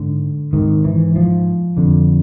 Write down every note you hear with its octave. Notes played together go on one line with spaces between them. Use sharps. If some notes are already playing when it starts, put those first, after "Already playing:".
Already playing: G#2 D3
G#2 D#3
E3
F3
F2 D3